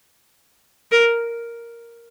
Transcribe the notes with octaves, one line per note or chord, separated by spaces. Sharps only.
A#4